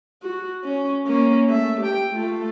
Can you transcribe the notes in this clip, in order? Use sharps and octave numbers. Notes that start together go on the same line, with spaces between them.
F#4
C#4
A#3 C#4
A3 E5
G4 G5
A3 F4